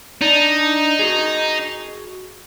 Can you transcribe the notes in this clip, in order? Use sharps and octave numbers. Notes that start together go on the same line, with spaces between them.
D4 D#4 D5
F#4 G#4